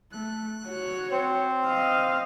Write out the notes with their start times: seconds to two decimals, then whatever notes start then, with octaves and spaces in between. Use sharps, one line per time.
0.13 A3 F#6
0.67 F#4 C#5
1.12 C4 C5
1.66 D#5 F5